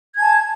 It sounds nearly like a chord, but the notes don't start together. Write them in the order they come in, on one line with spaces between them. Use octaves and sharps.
G#6 G#5 A5